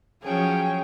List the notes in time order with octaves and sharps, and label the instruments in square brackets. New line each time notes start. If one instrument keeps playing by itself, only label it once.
[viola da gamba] F3 F#3 C#4 [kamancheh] G#4 G5